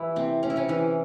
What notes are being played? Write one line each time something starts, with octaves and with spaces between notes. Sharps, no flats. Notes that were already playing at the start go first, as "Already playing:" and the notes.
Already playing: E3 G3 E4
C3 C4
C#4
E4
C3 C#4
E3 E4